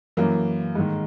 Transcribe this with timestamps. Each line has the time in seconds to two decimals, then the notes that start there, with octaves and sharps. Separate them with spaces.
0.17 F#2 E3 A#3
0.75 G#2 D#3